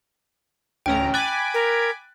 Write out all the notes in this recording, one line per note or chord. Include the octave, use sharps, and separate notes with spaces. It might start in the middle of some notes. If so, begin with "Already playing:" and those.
A1 D2 C#4 G5 A#5 D7
G#5 B5 D6 F#6 A6
A#4